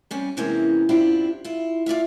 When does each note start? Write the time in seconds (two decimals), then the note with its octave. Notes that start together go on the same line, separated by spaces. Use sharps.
0.11 C3 G3 C#4
0.37 C3 E3 G#3 A#3 C4 C#4
0.89 F#2 C4 D4 E4 F4 G4
1.45 E4 F4
1.86 F4 D5 E5 F5